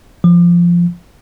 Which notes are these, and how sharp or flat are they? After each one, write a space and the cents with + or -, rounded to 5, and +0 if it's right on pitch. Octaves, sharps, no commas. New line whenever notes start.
F3 -10